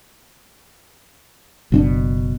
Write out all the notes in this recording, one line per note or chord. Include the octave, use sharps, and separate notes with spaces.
F#1 B2 C4 D4